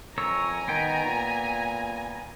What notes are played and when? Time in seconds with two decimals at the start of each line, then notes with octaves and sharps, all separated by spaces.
0.18 F2 A#4 C#5 G#5 A#5 E6
0.68 D#3 B3 G5
1.04 A#2